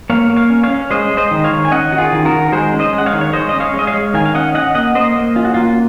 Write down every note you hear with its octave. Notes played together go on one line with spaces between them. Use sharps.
A#3 C#5 F5
A#3
C#5 F5
C#4
C#5 F5
C#4
G#3 C5 D#5
G#3
C5 D#5
D#3
C#5 F5
D#3
G#5
C#4 D#5 F#5
D#3 F#4
F4 G#4
D#3
F#4 A#4
D#3
A#4
G#3 G#4 C5
C#4
C5 D#5
G#3
F#5
C#5 F5
D#3
C#5
G#3 C5 D#5
C#4 D#5
C#5 F5
G#3
D#5
C#5 F5
G#3
D#3 F5 G#5
F5
C#4 D#5 F#5
C#4 D#5 F#5
A#3 D#5 F#5
A#3 C5 D#5
A#3
C#4 F4
F#4
A#3 F4